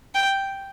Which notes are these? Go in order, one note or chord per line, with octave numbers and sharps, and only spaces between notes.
G5